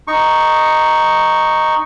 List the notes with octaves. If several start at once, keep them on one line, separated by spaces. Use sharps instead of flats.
D#4 C#6